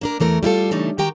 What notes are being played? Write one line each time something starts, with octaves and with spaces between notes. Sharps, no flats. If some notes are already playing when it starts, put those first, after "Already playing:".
A#3 D4 A#4
E2 E3 A3 A#4
G3 E4 F4 A4
C#3 E3 A3 D4 D#4
D#3 F#4 G4 G5 A#5